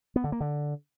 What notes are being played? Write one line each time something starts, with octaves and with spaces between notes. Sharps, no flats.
B3
D3
A#3
D3